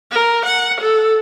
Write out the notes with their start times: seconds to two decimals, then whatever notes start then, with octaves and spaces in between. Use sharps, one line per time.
0.11 A#4
0.45 F#5
0.80 A4